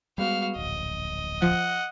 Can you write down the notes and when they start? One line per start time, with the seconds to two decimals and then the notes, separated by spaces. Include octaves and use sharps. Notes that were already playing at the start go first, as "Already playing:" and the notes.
0.18 G3 G#3 B3 F#4 F5
0.56 D1 A#1 D#5
1.42 F3 F#5